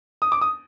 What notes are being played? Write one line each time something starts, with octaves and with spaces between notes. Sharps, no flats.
D#6
D6
D#6